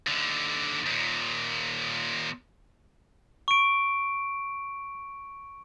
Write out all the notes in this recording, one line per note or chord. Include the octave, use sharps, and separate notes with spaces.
D#2 D3
D#2 A#2
C#6 D7